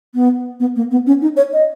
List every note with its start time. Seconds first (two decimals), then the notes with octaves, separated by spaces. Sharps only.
0.15 B3
0.60 B3
0.76 A#3
0.91 B3
1.07 C#4
1.22 D#4
1.37 C#5
1.53 D#5